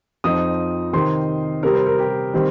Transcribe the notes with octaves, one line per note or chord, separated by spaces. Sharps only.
F2 F3 C4 D#4 D#6
C3 D#3 C4 D#4 C6
C3 G3 C4 A#4
C5
A#4
G4
D#3 G3 C4